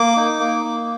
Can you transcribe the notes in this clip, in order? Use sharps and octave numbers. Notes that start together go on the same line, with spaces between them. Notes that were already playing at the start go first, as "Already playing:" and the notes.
Already playing: A#3 D6
D#4
A#3
A#3